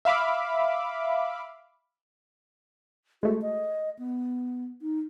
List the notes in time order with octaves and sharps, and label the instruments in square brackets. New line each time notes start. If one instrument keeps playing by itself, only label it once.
[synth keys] E5 F5 B5 D6
[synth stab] G#3 A3 [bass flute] F#4
[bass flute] D#5
B3
D#4